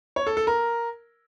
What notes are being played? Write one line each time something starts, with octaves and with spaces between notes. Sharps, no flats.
C#5
A4
A4
A#4